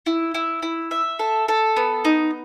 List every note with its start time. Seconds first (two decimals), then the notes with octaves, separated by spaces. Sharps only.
0.06 E4
0.34 E4
0.62 E4
0.91 E5
1.19 A4
1.48 A4
1.77 B3
2.05 D#4